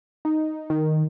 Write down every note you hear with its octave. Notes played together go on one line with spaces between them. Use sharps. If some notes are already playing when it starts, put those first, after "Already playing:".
D#4
D#3